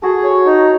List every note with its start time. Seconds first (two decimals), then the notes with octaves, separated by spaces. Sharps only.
0.02 F#4 G#4 A4
0.24 C#5
0.46 D#4